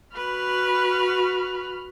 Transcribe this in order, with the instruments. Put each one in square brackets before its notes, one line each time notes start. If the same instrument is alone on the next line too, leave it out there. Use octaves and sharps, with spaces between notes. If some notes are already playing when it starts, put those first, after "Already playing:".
[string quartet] F#4 B5 F6 [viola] B4